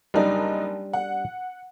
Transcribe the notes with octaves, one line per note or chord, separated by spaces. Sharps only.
F#1 G3 D4 D#4
F#5